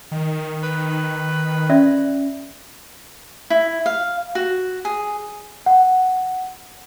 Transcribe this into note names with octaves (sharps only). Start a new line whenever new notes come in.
D#3
B4
C#4 D5 E5
E4
F5
F#4
G#4
F#5